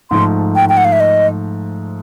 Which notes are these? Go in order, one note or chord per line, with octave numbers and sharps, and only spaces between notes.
G#2 F3 A3 C6
G5
G5
F#5
F5
E5
D#5